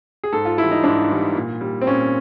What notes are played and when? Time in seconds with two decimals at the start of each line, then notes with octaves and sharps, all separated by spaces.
0.24 G#4
0.32 G#2 A4
0.45 F4
0.58 G3 E4
0.63 E3
0.71 D#4
0.84 G#2 D4
1.10 E3 G3
1.35 A#2
1.61 G3
1.82 C4
1.87 A#2 C#4